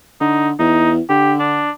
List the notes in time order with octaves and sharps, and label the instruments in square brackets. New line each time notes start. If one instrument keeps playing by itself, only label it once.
[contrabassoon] D3 [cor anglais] D#4
[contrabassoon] E2 [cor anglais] D#4
[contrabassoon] D3 [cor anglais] G4
[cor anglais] D4